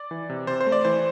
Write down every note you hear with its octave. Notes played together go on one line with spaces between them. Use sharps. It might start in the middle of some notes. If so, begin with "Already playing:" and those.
Already playing: D5
E3
C3
C3 C5
C5
A3
D5
E3 C5